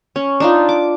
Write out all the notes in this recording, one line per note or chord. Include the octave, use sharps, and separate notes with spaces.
C#4
D4 D#4 F4
D6